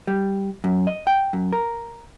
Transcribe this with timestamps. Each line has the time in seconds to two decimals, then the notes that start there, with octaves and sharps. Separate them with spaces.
0.07 G3
0.64 F#2
0.87 D#5
1.07 G5
1.33 F#2
1.53 A#4